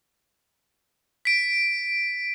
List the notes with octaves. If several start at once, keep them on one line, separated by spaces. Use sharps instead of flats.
B6 D7